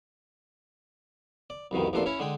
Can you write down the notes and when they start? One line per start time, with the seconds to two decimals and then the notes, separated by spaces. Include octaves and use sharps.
1.50 D5
1.71 C2 F2 B2 D#3
1.93 A1 E2 A#2 D4 A4 C6
2.06 C#4 E4 C#5
2.19 D3 G#3 G#4 G5